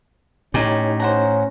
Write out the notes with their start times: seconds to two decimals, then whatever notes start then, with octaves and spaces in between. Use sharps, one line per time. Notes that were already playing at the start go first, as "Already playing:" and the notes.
0.54 A2 C#4 D#4 G4 G#5
1.00 C#4 C5 F#5 A#5